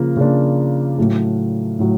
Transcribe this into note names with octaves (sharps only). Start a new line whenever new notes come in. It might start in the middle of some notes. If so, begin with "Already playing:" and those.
Already playing: C#3 F3 A#3 F4
C#3 F3 A#3 D4 F4
A2 F#3 A3
A2 F#3 A3